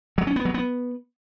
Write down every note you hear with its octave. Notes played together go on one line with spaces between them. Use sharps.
F#3
C#4
B3
F#3
B3